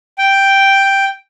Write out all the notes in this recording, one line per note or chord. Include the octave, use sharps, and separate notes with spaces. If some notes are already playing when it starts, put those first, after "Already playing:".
G5